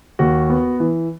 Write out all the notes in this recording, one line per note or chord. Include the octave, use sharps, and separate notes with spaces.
D#2 F#4
B3
E3